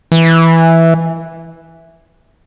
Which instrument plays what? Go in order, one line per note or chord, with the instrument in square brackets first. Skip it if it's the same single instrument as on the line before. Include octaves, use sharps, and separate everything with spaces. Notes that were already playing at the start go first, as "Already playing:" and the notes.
[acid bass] E3